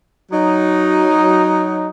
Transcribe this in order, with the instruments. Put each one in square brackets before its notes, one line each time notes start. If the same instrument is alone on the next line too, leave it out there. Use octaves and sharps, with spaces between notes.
[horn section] F#3 D#4